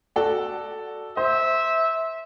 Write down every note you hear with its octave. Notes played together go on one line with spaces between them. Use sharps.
F#4 A4 D5
C5 E5